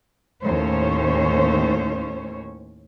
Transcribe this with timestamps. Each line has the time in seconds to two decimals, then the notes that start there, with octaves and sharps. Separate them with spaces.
0.43 D#2 A2 C#4 C5 C#5